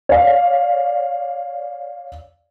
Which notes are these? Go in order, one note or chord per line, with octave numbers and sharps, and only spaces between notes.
C#5 D5 F5